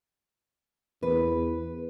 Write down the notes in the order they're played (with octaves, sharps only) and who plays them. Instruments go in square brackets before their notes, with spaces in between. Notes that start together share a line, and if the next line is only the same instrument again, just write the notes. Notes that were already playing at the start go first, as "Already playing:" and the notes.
[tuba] E2 [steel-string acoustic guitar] B4